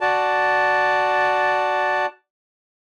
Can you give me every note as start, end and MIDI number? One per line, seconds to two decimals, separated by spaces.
0.01 2.06 66
0.01 2.06 74
0.01 2.06 81